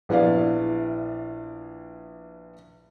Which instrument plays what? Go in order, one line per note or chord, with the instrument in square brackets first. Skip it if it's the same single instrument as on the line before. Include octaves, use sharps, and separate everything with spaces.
[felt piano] A#1 B3 E4 D5 F5